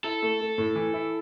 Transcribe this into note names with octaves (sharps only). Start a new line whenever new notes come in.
E4 A4
A3
A3
A2
E3
E4